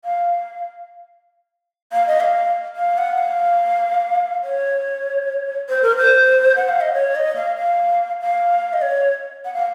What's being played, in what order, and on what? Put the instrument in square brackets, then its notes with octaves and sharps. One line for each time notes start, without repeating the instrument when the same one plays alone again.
[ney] F5
F5
D#5
F5
F5
F#5
F5
C#5
C5
A#4
C5
F#5
F5
D#5
C#5
D#5
F5
F5
F5
D#5
C#5
F#5
F5